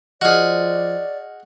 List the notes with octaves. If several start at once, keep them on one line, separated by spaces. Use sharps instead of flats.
F3 F#4 G#4 D5 D#5 F6